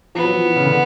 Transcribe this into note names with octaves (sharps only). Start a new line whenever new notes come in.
F3 B3
F#3
F3
E3
C#3
D3